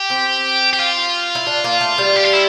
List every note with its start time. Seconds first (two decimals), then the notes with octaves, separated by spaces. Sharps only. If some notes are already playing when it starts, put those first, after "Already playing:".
Already playing: G4
0.10 C4
0.73 G4
0.79 F4
1.35 E4
1.47 D4
1.64 A#3
1.81 A3
1.98 G3
2.16 G4
2.25 F4
2.33 E4